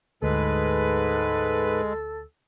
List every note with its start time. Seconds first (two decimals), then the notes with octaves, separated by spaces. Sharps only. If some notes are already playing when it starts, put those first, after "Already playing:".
0.23 D2 G#2 G#3 A4 B4